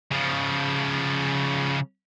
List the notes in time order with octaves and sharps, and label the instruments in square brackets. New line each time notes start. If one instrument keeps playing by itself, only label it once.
[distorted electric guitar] C#3 F3